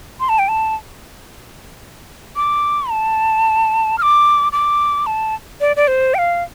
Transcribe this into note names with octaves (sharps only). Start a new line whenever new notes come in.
C6
A5
G5
A5
D6
A5
F6
D6
D6
A5
D5
D5
C5
G5
F5